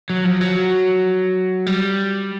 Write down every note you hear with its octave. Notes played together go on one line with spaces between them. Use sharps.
F#3
F3
F#3
G3